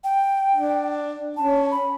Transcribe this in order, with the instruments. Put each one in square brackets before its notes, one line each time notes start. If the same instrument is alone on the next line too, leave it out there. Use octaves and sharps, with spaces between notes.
[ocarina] G5
[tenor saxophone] D4
[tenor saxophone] C#4 [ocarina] A5
[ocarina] B5